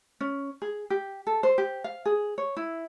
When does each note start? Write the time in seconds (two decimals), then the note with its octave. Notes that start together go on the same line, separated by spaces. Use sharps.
0.21 C#4
0.62 G#4
0.90 G4
1.27 A4
1.43 C5
1.58 G4
1.84 F5
2.05 G#4
2.38 C#5
2.57 E4